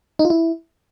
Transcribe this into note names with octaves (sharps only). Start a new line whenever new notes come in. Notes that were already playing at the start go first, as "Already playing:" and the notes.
D#4
F4
E4